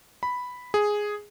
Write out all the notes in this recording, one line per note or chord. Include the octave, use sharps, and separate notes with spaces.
B5
G#4